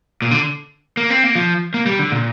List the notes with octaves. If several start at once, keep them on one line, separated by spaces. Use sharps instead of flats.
A#2
D3
A#3
C4
A#3
F3
A#3
G3
D3
A#2